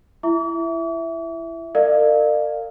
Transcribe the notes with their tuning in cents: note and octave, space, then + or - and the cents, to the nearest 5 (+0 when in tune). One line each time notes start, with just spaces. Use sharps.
E4 +20 E5 +0 D6 -45
A#4 -40 D5 +40 F5 +0